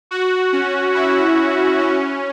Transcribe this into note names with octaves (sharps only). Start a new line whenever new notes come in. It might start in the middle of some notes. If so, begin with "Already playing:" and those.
F#4
C#4
E4
C#4